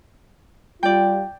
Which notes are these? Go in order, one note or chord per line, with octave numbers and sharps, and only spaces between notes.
G3 F4 D5 G5